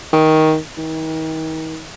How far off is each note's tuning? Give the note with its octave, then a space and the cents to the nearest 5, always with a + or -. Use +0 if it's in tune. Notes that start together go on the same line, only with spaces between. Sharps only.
D#3 +15
D#3 +40